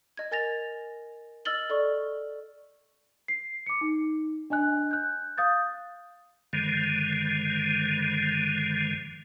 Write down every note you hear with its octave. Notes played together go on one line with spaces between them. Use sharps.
D#5 G#6
A#4 G#5 A6 A#6 F7
D#5 E6 F6 A6 F#7 G7
A4 D5 C#6
C7
D6 C#7
D#4
D4 D#5 G#5 F#6
F#6 G6
F5 D#6 G6 A6
G2 D3 D#3 F3 G#3